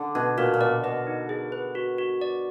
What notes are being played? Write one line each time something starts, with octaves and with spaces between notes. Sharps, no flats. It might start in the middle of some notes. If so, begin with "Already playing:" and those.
Already playing: D3
B2 D4
A#2 F#4
A#2
B2 D5
B2 D#5
D#4
G#4
B4
F#4
F#4
D5